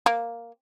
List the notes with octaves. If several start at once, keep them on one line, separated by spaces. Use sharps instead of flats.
A#3